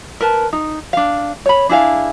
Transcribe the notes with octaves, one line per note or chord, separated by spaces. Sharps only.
A#4 B4 A5
D#4
D4 F5
C#5 B5
D4 E4 G#4 F5